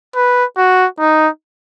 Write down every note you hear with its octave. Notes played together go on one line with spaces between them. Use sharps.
B4
F#4
D#4